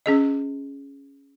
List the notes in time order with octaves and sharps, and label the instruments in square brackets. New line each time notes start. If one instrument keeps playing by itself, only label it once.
[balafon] C#4 G#4 D#5